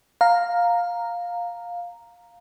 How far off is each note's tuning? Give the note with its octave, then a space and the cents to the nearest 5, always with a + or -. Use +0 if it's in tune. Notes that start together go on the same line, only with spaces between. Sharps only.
F5 +10 A#5 -5